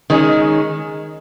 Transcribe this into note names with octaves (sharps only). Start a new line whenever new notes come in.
D#3 G#3 C#4